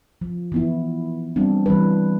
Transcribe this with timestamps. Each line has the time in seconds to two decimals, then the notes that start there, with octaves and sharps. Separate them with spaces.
0.21 F3
0.52 E3 B3 E4
1.36 G3 B3 C4 D4
1.66 E3 G3 B4